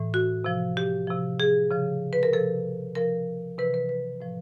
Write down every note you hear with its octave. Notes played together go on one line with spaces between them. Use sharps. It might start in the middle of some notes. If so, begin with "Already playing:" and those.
Already playing: A2 E3
F#4
C3 F3
G4
C3 F3
G#4
C#3 F3
B4
A#4
C3 F3 A4
C3 F3 A#4
C3 E3 B4
B4
B4
A2 F3